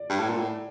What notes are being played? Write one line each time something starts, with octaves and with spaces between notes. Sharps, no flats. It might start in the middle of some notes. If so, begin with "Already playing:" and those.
Already playing: D5
G2
A2
A#2
A2